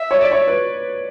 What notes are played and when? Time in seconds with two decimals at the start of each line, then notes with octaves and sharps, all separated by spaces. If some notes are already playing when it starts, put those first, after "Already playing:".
Already playing: E5
0.11 C#5
0.21 D5
0.32 C#5
0.48 B4